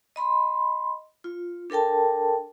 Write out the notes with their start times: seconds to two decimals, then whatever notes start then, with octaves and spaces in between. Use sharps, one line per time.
0.16 D#5 B5 C6
1.24 F4
1.70 D4 A4 A#4 G5 A5